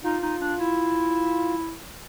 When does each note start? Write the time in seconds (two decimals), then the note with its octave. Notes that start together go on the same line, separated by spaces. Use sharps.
0.04 D#4 F4
0.23 D#4
0.41 D4
0.60 E4